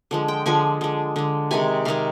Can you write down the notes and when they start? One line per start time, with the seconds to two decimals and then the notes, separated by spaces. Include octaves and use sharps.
0.11 D3 F3 G#3
0.28 G5
0.46 D3 F3 G#3 G#5
0.81 D3 G#3
1.16 D3 G#3
1.51 C3 D#3 G#3 G#5
1.85 C3 D#3 G#3 F5